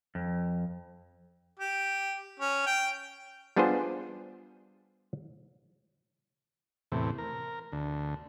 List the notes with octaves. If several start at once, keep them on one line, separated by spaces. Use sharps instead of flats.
F2
G4
C#4
G5
G3 B3 D4 F4 G#4 C5
E2 A2 C3
A#4
D2